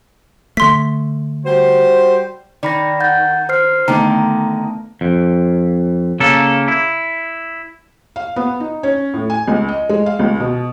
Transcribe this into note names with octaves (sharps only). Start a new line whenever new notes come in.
D3 A3 C6 B6
G3 F#4 C5
D#3 D5 B5 A#6
F#5 G6 A6
C5 F6 C7
D3 D#3 A3 B3 A#5
F2
C#3 A#3 A4
E4
F5
B3
D#4
C#4
A2
G#5
C#2
D#5
G#3
F5
C#2
B2